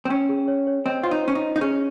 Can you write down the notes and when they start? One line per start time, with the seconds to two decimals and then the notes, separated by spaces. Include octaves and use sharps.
0.05 C4
0.10 C#4 G5
0.29 G#4
0.48 C#5
0.67 C#5
0.86 C4 D#5
1.03 F4 C5
1.11 D#4
1.24 C#4 C5
1.35 D#4
1.42 D#5
1.56 D#4
1.61 C#4 G#4